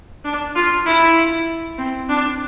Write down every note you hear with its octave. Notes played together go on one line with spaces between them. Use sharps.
D4
F4
E4
C4
D4